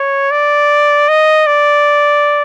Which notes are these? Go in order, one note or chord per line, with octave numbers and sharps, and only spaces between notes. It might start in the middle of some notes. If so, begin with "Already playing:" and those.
Already playing: C#5
D5
D#5
D5